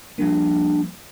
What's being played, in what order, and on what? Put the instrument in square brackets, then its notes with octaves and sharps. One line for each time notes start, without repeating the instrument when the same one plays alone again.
[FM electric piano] F3 G3 A#3 [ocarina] D4